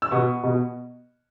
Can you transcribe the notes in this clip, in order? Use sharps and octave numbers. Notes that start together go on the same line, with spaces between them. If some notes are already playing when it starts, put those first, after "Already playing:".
E6
B2 B3 C#6
B2 B3